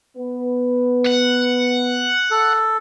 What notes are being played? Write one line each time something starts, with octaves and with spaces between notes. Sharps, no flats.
B3 B4
F#5
A4